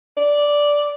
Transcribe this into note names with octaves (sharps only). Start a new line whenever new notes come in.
D5